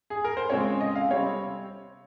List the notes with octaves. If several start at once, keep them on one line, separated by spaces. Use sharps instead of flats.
G#4
A#4
C5
C#3 G#3 C4 F4 C#5
D#5
F5
C3 G3 C4 C#5